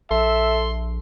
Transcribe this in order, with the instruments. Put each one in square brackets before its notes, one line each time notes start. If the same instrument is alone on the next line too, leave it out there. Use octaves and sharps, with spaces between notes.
[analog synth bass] A#1 [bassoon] A4 [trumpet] E5 [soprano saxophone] C6